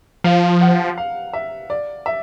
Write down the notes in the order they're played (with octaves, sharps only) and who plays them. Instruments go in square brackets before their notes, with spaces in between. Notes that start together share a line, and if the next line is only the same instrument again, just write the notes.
[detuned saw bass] F3 [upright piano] F5
[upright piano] F#5
F5
E5
D5
E5